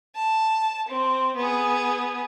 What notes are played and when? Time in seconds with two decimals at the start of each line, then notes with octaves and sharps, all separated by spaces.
0.16 A5
0.89 C4
1.37 B3 G#4